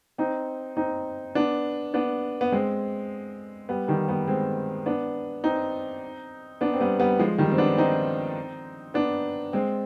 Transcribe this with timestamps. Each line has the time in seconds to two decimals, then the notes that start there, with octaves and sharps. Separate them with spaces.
0.18 C4 D#4
0.77 C4 D#4
1.35 B3 D4
1.94 B3 D4
2.41 B3
2.52 G#3 C4
3.69 G3 B3
3.88 D#3 G3
4.09 G3 B3
4.28 G#3 C4
4.86 B3 D4
5.44 C4 D#4
6.61 B3 D4
6.74 C4
6.81 G3 B3
7.00 G3 B3
7.19 F3 G#3
7.38 D#3 G3
7.52 C4
7.58 B3 D4
7.78 C4 D#4
8.94 B3 D4
9.53 G#3 C4